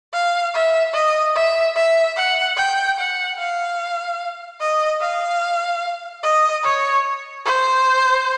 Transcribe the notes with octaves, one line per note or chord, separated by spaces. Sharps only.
F5
E5
D#5
E5
E5
F#5
G5
F#5
F5
D#5
F5
D#5
C#5
C5